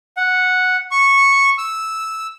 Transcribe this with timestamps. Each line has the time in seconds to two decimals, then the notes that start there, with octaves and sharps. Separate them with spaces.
0.17 F#5
0.91 C#6
1.58 E6